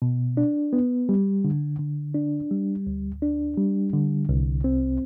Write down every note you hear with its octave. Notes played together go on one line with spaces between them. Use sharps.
B2
D4
B3
G3
D3
D3
D4
G3
D2
D4
G3
D3
C2
C4